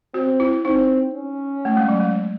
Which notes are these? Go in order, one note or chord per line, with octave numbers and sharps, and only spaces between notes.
C4 F#4
E4
C4 D#4
C#4
A3
G#3
F#3
G#3